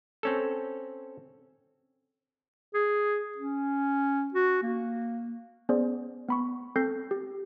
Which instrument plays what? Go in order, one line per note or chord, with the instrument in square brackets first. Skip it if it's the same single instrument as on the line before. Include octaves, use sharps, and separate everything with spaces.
[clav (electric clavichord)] C4 C#4 A4
[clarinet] G#4
C#4
F#4
A#3
[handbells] B3 C#4 G#4 C5 D5
B3 B5 C#6
C4 A4 G6 A#6 C7
G4